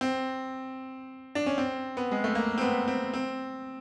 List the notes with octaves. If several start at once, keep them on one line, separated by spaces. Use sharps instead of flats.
C4
D4
C#4
C4
B3
G#3
A3
A#3
C4
B3
C4
C4